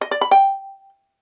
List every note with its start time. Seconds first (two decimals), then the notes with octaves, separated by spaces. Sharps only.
0.01 D#5
0.11 D5
0.21 B5
0.31 G5